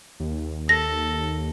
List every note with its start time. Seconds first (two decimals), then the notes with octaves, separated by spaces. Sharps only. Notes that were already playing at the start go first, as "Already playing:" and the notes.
0.20 D#2
0.69 A4 A#6